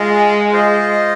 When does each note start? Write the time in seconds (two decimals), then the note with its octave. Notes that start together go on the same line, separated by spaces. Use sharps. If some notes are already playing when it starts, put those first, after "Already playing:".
Already playing: G#3 F4 G#4 D#5
0.52 F4 C5 D#5